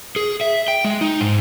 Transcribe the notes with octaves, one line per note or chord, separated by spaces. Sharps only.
G#4
E5
G5
G#3
D#4
G#2